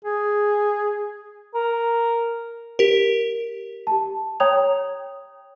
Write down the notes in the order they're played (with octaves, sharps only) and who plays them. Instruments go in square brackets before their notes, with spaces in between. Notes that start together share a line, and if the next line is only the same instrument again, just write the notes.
[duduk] G#4
[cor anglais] A#4
[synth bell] G4 A#4
[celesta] G4 A5
C#5 G5 A#5 D#6 G#6 F7